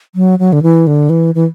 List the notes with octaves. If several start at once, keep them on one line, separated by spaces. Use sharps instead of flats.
F#3
F#3
D3
E3
D3
E3
E3